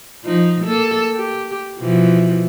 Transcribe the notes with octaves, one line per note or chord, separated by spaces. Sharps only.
F3 D#4
A#3 A4
G4
B2 E3 F3